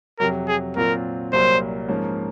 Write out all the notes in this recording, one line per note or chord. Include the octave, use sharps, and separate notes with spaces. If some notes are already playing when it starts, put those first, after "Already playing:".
F2 C3 F#3 A#4
G#4
A#2 F#3 C4 F4 A#4
C2 A#2 F#3 A#3 C5
G#2 F3 A#3 C#4